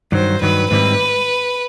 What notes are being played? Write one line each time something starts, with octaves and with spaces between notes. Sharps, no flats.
G2 D#3 F#3 C5
G2 D#3 F#3 B4
G#2 D#3 G3 C4 E4 B4